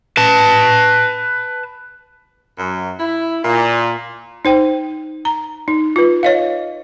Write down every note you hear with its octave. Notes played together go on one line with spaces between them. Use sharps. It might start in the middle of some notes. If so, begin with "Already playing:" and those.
B4 A5
F#2
E4
A#2
D#4 C5 G5
A#5
D#4
F4 B4
C#5 D#5 F5